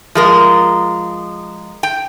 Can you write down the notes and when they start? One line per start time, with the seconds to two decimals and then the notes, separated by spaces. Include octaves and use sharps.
0.15 F3 G#3 A#4
1.83 G5